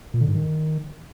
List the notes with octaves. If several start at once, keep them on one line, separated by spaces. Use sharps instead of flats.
A#2
D3
G#2
D#3